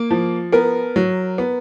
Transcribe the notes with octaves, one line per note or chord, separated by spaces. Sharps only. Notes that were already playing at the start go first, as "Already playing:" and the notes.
Already playing: A#3
F3
B3 A#4
F#3
B3